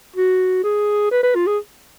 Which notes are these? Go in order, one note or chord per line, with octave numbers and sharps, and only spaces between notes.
F#4
G#4
B4
B4
F4
G#4